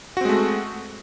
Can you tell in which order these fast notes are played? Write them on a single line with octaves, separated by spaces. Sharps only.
F#4 C4 G#3 A3